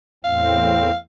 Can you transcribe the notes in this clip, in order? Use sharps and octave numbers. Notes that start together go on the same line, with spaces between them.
E2 A2 C4 F5